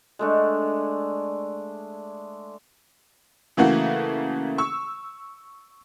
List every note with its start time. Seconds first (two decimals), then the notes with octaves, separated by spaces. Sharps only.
0.19 G#3 A3 D4
3.57 C#3 E3 A3 A#3 F#4
4.58 C#6 E6